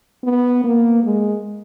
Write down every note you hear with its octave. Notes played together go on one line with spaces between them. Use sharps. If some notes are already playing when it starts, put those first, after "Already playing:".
B3
A#3
G#3